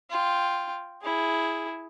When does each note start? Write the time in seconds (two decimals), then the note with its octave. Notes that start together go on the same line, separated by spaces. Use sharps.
0.10 F4 G5
1.02 E4 G#4